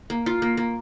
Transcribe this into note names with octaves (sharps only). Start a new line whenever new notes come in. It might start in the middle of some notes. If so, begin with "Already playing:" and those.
A#3
F4
A#3
A#3